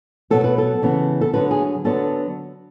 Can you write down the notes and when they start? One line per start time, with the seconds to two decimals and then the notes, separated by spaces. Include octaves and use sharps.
0.30 B2 F#3 B3 A4
0.44 B4
0.58 A4
0.82 C#3 E3 B3
1.21 A4
1.33 D3 F#3 B3 B4
1.51 G#4
1.84 D3 F#3 B3 A4